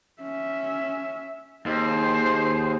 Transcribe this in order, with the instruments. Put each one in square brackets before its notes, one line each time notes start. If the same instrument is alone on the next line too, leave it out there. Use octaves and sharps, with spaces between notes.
[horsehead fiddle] C#4 E5
[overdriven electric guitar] D#2 [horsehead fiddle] G#4 C5